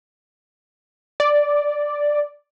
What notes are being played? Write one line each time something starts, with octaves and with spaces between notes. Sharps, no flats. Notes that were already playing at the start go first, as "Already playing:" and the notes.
D5